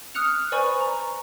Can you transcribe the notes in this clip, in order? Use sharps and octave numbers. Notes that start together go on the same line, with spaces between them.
D#6 F6 F#6 C#7 F7
B4 C5 D5 G#5 B5 C#6
A#5